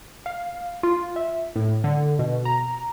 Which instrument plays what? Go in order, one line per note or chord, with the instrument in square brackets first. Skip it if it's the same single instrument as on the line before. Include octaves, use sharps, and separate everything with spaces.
[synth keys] F5
F4
E5
A2
D3
B2
A#5